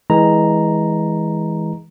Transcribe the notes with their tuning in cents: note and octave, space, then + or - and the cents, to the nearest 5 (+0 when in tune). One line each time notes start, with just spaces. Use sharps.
E3 -20 G#3 +0 A#5 +0